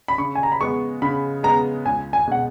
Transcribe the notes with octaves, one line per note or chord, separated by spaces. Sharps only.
B5
C#3 C#6
G#5
A#5
B5
G#3 B3 C#6
C#3 B5
G#3 B3 A#5
C#2 G#5
G#5
B2 G#3 F#5